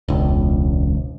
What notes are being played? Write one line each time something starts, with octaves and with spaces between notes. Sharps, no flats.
E1 C#2